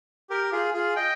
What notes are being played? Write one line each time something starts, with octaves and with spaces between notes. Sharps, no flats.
G4 A#4
F4 G#4
F4 G#4
D#5 G5